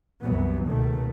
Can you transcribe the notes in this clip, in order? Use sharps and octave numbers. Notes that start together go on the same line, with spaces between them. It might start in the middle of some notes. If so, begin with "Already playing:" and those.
C2 F#2 E3 B3
C#2 B2 D#3 A3